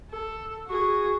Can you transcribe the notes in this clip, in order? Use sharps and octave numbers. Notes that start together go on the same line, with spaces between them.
A4
F#4 G#4